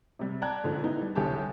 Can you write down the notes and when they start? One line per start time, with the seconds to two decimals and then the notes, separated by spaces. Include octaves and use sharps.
0.19 C3 G3
0.42 D5 G5 A5 A#5 F#6 G#6
0.64 G#2 D3 F3
0.82 B3 D#4 E4
1.01 G3
1.15 G1 C2 D3 G4 G#4 A5